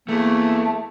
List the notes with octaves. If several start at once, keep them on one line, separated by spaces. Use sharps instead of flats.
E2 A3 A#3